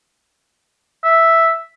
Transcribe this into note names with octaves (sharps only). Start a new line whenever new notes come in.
E5